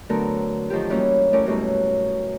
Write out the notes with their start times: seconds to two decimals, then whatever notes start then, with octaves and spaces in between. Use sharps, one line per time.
0.09 D3 F#3 A3 B3 A4 A#4
0.70 D#3 F3 F#3 A3 F4 G4
0.90 E3 G3 A#3 C#4 D#4 E4
1.33 A3 C#4 E4 A#4 D5 G#5
1.46 F#2 B2 G3 A3 C#4 E4